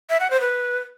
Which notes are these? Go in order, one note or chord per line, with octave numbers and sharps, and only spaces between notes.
E5
F#5
C5
B4